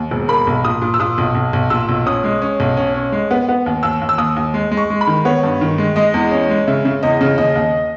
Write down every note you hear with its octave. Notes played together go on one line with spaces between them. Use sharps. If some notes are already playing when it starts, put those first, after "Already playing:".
Already playing: D#2
E1
A#3 B5
B1
A#2 D#6
A#2
E6
A#2 D#6
B1
B1
B1
A#2 E6
B1
C#4 D#6
G#3
C#4
B1
C#4
C#4
G#3
B3
B3
D#2
D#2 E6
D#2
E6
D#2 D#6
D#2
G#3
G#3
C#6
G#3
B5
D#3
B3 C#5
G2
D#3
G#3
G#3 D#5
E2
C#4
G#3
C#3 E5
C#3
E2 D#5
C#3
D#2 D#5
D#2